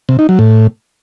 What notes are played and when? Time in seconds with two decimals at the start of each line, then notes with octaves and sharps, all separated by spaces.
0.09 C3
0.19 D#4
0.29 F#3
0.39 A2